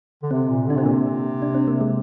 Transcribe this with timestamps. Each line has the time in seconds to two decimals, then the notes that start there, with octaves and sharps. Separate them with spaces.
0.23 D3
0.31 C3 C4
0.49 A#2
0.67 D3
0.70 D4
0.76 C3 C4
0.84 A#2 A#3
0.92 C3
1.42 D4
1.55 C4
1.68 A#3
1.81 G#3